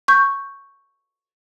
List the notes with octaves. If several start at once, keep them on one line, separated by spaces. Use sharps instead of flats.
C#6 G6